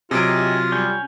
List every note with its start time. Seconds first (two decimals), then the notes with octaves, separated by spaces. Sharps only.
0.11 C3 F#3 D#4 F4 G4 G#4 D#5 D7
0.72 G3 C#4 C#6 G6